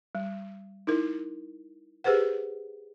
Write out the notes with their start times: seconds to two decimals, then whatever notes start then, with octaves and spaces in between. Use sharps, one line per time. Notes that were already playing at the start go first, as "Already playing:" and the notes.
0.15 G3
0.87 D#4 E4 A#4
2.04 G4 G#4 B4 C5 F#5